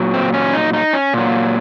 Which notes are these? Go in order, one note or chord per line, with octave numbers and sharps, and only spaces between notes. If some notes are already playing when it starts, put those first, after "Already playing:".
Already playing: A#2 F#3
C4
C#4
D#4
D#4
C#4
A#2 F#3